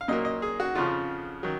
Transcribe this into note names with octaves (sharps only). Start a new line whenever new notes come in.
F5
A#2 F#3 A#3 D#5
D#5
G#4
F#4
F2 C#3 F3 F4
D#3 F#3